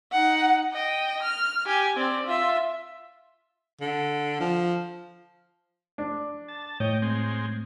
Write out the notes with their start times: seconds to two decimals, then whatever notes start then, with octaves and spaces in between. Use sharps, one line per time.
0.12 D#4 F#5
0.72 D#5 G5
1.22 F6
1.66 G4 G#5
1.97 C4 D5
2.26 F4 E5
3.81 D3
4.40 F3
5.98 D4
6.48 A5
6.80 A2 C#5 D#5 G5
7.02 G#3 C4